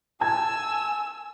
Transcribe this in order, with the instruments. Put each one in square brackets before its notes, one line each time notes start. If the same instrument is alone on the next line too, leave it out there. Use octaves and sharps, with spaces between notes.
[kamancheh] G#5 E6 [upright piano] A5 G#6